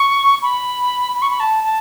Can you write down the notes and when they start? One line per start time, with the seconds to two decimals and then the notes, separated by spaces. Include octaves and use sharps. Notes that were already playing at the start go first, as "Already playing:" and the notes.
Already playing: C#6
0.42 B5
1.15 B5
1.22 C#6
1.30 B5
1.40 A5
1.64 A5